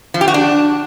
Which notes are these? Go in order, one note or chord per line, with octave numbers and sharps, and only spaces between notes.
F3
G4
F#4
D4